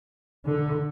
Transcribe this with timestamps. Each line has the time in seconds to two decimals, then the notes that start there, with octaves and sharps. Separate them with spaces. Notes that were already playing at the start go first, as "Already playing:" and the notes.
0.45 D3